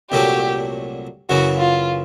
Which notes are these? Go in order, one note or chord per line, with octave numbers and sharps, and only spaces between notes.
C2 A#2 F#3 A3 G4
F#2 C#3 E3 F#4
F4